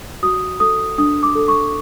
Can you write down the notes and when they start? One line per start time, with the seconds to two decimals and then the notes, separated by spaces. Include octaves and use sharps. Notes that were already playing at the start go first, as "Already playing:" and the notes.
0.23 F#4 D#6
0.60 A4 D#6
0.98 D4 D#6
1.23 D6
1.35 A4
1.48 C#6